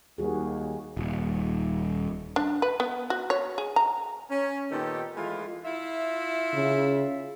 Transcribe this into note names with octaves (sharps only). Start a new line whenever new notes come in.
D#2 G3 F#4 G#4
D#1
D4
B4
B3
F#4
C#5
G#4
A#5
C#4
A#2 D#3 B3 D#4 G4 A4
E3 G#3 A3 F4
E4 F4 E5
C#3